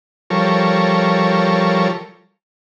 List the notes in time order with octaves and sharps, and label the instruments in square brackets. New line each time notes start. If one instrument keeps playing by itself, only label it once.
[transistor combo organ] F3 G3 A4 A#4 C#5